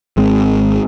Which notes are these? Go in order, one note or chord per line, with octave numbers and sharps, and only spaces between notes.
G#1 G#3 C4